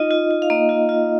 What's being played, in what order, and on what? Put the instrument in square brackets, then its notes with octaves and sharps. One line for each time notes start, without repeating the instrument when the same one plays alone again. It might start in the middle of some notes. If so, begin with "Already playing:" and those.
Already playing: [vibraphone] D#4 F4 D#5
F4
F4
F5
A#3 D#5
F4
F4